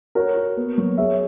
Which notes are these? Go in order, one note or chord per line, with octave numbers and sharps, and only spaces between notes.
F#4 A#4 C#5
F#4
B3
F#3
G#4 C#5 E5